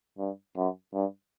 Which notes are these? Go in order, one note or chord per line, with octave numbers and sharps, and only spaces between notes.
G2
F#2
G2